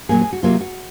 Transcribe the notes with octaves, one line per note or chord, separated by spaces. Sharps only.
A#2 F#3 A#3 G#4
G#4
F#4
C3 F#3 A#3 F4
F#4